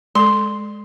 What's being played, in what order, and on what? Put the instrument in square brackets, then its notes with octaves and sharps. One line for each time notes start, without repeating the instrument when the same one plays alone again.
[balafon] G#3 A4 [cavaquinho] C6